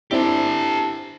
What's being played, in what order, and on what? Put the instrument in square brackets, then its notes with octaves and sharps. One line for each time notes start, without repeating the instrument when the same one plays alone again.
[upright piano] C4 D4 E4 [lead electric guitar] G4 A4